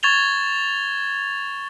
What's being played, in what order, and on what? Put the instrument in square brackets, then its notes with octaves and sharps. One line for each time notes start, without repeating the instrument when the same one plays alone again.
[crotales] C#6 G#6 A6 F7 G7